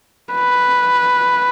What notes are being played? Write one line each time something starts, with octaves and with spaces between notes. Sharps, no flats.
B4